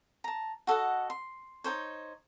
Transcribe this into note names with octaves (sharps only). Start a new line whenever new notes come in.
A5 A#5
F#4 A4 D#5 F#5
C6
D#4 A4 C5 C#5